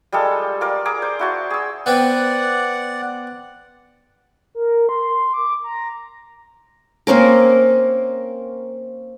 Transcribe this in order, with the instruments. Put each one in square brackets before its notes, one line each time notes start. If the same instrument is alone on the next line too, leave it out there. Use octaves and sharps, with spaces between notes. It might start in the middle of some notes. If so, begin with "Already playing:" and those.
[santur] G3 G#3 F4 A4
F4 A#4 D5
G#4 A#5 D6
C5
E4 F#4 A5
G#4 E6
[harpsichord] B3 C4 [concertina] D5 F#5
[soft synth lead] A#4
C6
D6
A#5
[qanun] A#3 C4 C#4 A#4